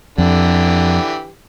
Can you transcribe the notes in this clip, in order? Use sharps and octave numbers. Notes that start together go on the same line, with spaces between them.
F2 D3 E3 G4